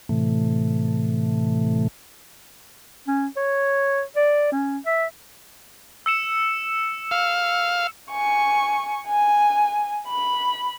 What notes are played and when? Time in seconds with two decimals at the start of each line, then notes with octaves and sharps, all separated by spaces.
0.09 A2 C3 E3 A3
3.08 C#4
3.37 C#5
4.16 D5
4.52 C#4
4.86 E5
6.06 E6 C#7 E7
7.11 F5
8.12 G#5 C#6
9.08 G#5
10.08 B5